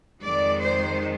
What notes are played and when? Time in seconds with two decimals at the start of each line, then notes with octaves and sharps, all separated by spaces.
0.21 F2 D#3 G#3 D5
0.60 C5